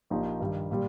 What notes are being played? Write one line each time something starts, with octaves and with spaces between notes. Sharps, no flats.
A#1 A#2 F3 D#4 G4
G2 D#3 G3
A#2 G3